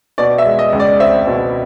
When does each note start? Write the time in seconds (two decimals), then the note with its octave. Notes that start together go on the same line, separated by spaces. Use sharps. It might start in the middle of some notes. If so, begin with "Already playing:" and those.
0.18 B2 D5
0.38 E5
0.45 G#3
0.59 D#5
0.73 C#2
0.80 D5
1.00 C4 E5
1.27 B2